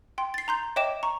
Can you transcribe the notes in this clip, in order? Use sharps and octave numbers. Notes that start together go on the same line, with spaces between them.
G5 C6
A6 C7
A#5 C6 G6
C#5 D#5 E5 G5 D6 E7
A#5 C#6